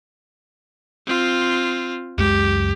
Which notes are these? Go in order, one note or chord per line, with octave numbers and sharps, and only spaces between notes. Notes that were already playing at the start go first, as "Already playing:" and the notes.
C4 F4
C#2 F#2 G#3 G4